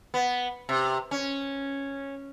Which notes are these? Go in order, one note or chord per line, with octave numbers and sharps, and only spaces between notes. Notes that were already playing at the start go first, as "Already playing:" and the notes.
B3
C3
C#4